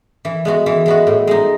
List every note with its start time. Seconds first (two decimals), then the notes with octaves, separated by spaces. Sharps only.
0.25 E3
0.45 G#3 B3 F#4
0.66 E3
0.86 G#3 B3 F#4
1.07 A2
1.27 G#3 D#4